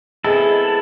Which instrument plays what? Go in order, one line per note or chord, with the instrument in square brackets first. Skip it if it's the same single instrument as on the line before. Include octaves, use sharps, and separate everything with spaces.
[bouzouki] G#3 B3 C4 [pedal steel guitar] E4 A4